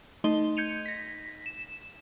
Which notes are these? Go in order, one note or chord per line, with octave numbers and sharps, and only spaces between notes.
A3 D#4 D#5 C6 G7
G6 G#6 C#7 D#7 F7
A#6 B6
E7